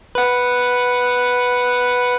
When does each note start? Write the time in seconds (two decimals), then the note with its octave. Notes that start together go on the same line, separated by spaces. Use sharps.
0.15 B4 F#5